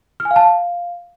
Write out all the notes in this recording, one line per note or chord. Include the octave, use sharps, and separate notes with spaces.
F6
G#5
F5
A5
F5